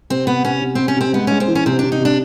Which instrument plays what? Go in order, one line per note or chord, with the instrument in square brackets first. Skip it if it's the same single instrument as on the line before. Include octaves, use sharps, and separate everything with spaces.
[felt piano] C3 [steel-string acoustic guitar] C4
[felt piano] C3 [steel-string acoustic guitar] B3
[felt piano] C3 [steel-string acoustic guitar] C#4
[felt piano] C3
[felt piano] C3 [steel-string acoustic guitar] C4
[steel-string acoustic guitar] C#4
[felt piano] C3 [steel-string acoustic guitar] C4
[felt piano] G#3 [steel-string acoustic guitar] B3
[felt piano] G#3 [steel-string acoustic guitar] C#4
[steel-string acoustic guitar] C4
[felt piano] E3
[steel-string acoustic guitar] C#4
[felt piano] C3 [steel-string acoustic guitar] C4
[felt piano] C3 [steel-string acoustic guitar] D4
[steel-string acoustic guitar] D#4
[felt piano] C3 [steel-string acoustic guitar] D4